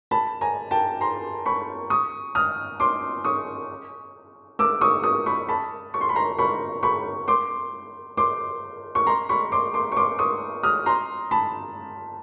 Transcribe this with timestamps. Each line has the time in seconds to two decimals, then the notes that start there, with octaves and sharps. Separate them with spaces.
0.11 A5 B5
0.41 G#5 A#5
0.71 G5 A5
1.01 A#5 C6
1.46 B5 C#6
1.90 C#6 D#6
2.35 D#6 F6
2.80 C6 D6
3.24 C#6 D#6
4.59 D6 E6
4.81 C#6 D#6
5.04 C#6 D#6
5.26 B5 C#6
5.49 A5 B5
5.94 C#6
6.01 C6
6.09 B5
6.16 A#5 C6
6.39 B5 C#6
6.83 B5 C#6
7.28 C6 D6
8.17 C6 D6
8.95 C#6
9.07 A#5 C6
9.29 B5 C#6
9.52 C6 D6
9.74 C6 D6
9.92 C#6
9.97 C6 D6
10.19 C#6 D#6
10.63 D#6 F6
10.86 A#5 C6
11.31 A5 B5